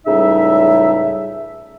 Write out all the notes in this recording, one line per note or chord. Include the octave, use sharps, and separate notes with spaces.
C#2 A2 C#3 G3 D#4 E5